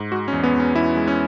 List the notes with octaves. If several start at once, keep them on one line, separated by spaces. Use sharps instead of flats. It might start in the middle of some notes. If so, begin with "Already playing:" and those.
Already playing: G#2
G#3 F#4
C#4
E2
B3
E2 C#4
E2 E4
G#3
C#4